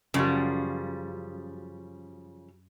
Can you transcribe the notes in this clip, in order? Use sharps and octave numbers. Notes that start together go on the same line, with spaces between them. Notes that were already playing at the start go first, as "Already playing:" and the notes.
F#2 C#3 F3 G3